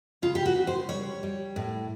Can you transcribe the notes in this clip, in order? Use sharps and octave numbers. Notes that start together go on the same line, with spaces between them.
C#3 F4
G4
F#4
C#3
C5
G3 C#5
G3
A2